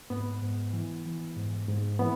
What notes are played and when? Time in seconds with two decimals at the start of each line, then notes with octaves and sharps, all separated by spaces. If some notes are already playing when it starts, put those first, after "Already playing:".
0.10 G#2 B3
0.42 G#2
0.73 E3
1.05 E3
1.37 G#2
1.68 G#2
1.99 E3 B3